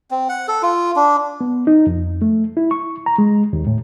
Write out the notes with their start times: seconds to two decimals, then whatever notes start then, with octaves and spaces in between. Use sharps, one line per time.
0.11 C4
0.29 F#5
0.48 A4
0.63 F4
0.96 D4
1.41 B3
1.67 D#4
1.87 F2
2.22 A3
2.57 E4
2.71 C#6
3.06 A#5
3.18 G#3
3.53 D#2
3.67 A2